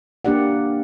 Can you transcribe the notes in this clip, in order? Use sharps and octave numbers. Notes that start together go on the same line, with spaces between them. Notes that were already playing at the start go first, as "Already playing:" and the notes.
A#3 D4 G4 D5 F#5